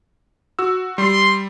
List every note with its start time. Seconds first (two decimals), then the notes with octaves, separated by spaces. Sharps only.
0.59 F#4 E6
0.98 G3 C6